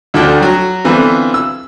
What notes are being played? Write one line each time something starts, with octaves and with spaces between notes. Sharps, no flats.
D2 D3 F3 D4 G5
F#3 F#4
D3 E3 B3 C4 F4
E6